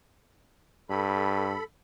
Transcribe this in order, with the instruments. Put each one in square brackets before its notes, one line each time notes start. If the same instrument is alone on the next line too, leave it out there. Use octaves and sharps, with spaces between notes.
[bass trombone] G2 [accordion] A4 B5